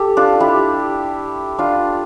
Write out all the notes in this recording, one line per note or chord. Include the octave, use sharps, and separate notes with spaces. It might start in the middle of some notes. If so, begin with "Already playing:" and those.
Already playing: G4 A4
D4 F4
E4 G4
D4 F4